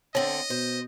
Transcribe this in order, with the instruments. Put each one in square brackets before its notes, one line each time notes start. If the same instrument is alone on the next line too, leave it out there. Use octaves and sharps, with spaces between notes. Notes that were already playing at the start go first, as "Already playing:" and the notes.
[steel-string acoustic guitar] D3 C4 A4 [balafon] C#5 [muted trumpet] D#5
[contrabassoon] B2 [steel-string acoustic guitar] C5